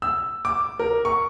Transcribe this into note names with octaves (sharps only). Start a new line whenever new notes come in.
E6
D6
A#4
C#6